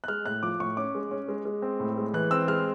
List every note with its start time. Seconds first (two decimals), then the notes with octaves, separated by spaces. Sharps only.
0.04 F#6
0.08 G#3 F6
0.26 A2 F#6
0.43 F3 D6
0.60 A2 C#6
0.77 C#4 D6
0.95 G#3
1.11 C#4
1.28 G#3
1.45 G#3
1.62 C4
1.80 A2
1.97 G#3
2.14 E3 F#6
2.31 C4 E6
2.48 G#3 F6